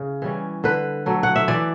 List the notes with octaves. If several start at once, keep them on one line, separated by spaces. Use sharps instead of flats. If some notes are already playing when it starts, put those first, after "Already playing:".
Already playing: C#3 E4
E3 G3 C#4
D3 B4
F#3 A3
F#5
E5
E3 D5